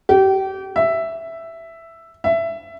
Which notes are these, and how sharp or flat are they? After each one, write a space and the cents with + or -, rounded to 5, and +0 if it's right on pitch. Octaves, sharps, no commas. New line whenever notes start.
G4 -30
E5 +5
E5 +15